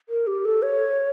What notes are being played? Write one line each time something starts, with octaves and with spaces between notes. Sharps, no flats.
A#4
G4
A4
C#5